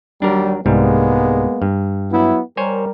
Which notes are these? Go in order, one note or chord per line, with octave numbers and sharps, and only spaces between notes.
D#2 F#3 G3 D4 A#4
C2 G#2 G3 G#3 A#3 B3
G2
F#3 B3 E4
G3 A#4 C5 C#5 G#5